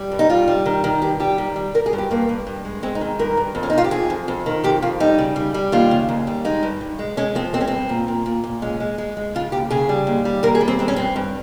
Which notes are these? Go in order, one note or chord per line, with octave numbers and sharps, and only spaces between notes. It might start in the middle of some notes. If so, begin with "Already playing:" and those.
Already playing: G3
G2
D#4
G3 F4
G3
D#3
D#3
G2 G4
G3 G4
D#3
G3
G3 A#4
G#4
G2
G4
G2 A#3
G2
G2
G#3
G#3 C4
D#4
D#3
G2 A#4
G2
F2
C#4
D#4
F2 F4
G4
F2 G#4
F2
F2
D#3
F2 G4
F2 F4
G3 D#4
C#3
G3
G3
D#2 F4
C#3
D#2
G3
G#3 D#4
G2
G2
G#3
G#3 C#4
F3 C4
G#3 C4
C#4
G2 C4
A#2
A#2
A#2
A#2
G#3 C#4
G#3
G#3
G#3
C#3 F4
D#2 G4
C#3 G#4
G3
D#2
G3
D#2 A#4
G#4
G3
C4
G#3 C4
C#4
G2 C4
G2